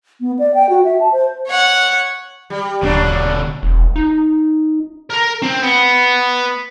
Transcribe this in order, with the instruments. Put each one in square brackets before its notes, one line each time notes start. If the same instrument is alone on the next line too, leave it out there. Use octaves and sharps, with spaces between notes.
[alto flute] B3
D5
G5
F#4
E5
A5
C5
[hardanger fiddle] C#5 F#5
[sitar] G3
[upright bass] D#1 G#1 [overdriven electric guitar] B2 D3 [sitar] F#3 D4
[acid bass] E1
D#4
[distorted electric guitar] A#4 A#5
C4
B3